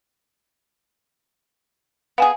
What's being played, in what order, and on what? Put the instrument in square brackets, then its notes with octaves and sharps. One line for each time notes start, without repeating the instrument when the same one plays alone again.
[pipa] B3 G#4 [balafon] F5 G#5